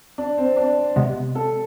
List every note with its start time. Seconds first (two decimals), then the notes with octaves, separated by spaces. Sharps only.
0.18 D4
0.38 C4
0.57 D4
0.96 C3 G#3 B3
1.35 A4